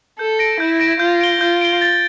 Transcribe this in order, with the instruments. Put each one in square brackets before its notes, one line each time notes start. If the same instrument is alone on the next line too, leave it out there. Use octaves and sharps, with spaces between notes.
[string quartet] A4 [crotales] G6
[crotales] A#6 D7
[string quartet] E4 [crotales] G6
[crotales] A#6 D7
[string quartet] F4 [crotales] G6
[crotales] D7 G7
[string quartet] F4 [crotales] G6
[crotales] D7 G7
A6